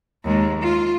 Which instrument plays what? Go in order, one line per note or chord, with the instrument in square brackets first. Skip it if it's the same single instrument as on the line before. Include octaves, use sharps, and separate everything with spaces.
[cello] D#2 G#3
F4